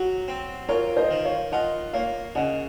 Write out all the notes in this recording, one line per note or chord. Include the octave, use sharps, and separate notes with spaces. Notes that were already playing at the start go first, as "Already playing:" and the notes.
Already playing: F#3
C4
F4 A#4 C#5
C5 D#5
D#3
C#5 F5
F4 D#5 F#5
A#3 C#5 F5
C#3 D#5 F#5